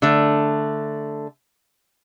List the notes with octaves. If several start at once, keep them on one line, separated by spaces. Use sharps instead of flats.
D3 A3